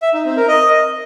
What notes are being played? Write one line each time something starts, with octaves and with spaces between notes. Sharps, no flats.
E5
D#4
C4
A#4
D#5